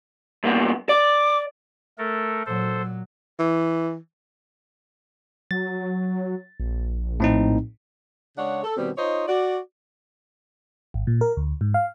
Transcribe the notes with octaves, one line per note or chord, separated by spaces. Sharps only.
G2 A#3 B3
D5 D6
A3 A4 A#4
A#2 F#3 A4 C5
E3
F#3 A6
A#1
A2 C4 D#4
C#3 G#3 D4 C#5 F#5
A4
B2 D#3 G3 B3 C4
D#4 F4 C5 C#5 D#5
F#4 D5
G#1
A#2
A#4
D2
G#2
F5